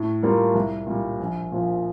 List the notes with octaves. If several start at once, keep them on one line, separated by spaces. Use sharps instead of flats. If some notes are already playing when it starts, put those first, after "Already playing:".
Already playing: A2
G3 A#3 F4 A#4
C2
A#2 G3
A#1
A#2 F3